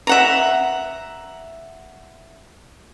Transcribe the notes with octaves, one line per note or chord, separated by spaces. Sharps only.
E5 F#5 A#5